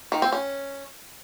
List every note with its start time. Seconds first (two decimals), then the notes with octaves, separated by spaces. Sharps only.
0.12 D#3
0.22 C4
0.32 C#4